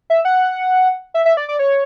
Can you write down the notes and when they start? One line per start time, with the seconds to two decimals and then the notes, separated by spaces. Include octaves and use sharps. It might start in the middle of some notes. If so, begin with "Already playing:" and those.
0.10 E5
0.25 F#5
1.14 E5
1.25 E5
1.37 D5
1.49 D5
1.59 C#5